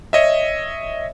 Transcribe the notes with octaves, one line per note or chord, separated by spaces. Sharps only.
C#5 D#5 E5